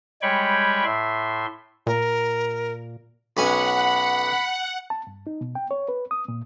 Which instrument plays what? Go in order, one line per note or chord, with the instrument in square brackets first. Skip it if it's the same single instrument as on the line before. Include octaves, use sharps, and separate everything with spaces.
[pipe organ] G3 G#3 C#5 G5 B5 C#6
A2 E5 C6
[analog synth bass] A#2 [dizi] A#4
[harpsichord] B1 C#4 G#5 [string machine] F#5 [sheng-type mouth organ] B5
[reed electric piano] A5
G2
D#4
B2
G5
C#5
B4
D#6
A#2